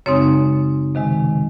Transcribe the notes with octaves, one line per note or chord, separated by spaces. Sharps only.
F#2 C#3 G#3 C4 D#4 C#5
C3 D#3 G#3